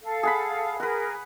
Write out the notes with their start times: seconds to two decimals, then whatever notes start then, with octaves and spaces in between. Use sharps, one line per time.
0.03 A4 F5
0.23 G#4 F#5 B5
0.80 G#4 A#4 B4 F#5